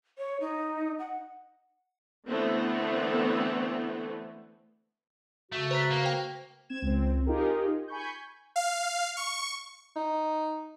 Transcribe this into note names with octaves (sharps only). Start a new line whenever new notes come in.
C#5
D#4
F#5
D3 E3 A3 B3 C4
C#3 A3 F#4
B4 C5 A#5 B6
A#3
C5 G5
C4 G#6 E7
C#2 C4
D#4 F4 G4 G#4 A#4
G#5 B5 C#6 G6
F5
C#6
D#4